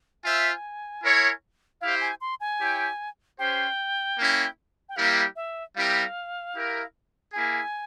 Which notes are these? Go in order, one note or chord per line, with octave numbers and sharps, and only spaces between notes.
F4 C5 E5 G#5
E4 A#4 C#5
E4 G4 C5 F5
G#5
C6
G#5
E4 G4 C#5 G5
C#4 G4 C5 G5
A#3 C#4 E4
G5
G3 A#3 E4 G4 A#4 F5
E5
G3 C4 E4 G4 A#4 F5
E4 G4 A#4
A#3 E4 G#4 G#5